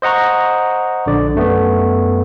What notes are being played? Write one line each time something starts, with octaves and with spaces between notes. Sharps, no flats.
C5 D#5 F#5 A#5 C#6
A#1 D3 D5
F#2 A3 B3